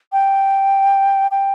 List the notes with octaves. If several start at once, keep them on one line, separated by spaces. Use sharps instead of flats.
G5
G5